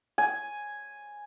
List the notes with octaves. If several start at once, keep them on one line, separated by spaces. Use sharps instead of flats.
G#5